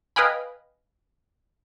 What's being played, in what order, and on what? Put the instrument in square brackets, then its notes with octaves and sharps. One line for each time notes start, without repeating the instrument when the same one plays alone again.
[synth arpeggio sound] B4 D#5 F5 G5 G#5 B5